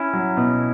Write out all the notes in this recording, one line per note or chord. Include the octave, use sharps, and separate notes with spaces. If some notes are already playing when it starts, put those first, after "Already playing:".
Already playing: C#4 E4
F#3
B2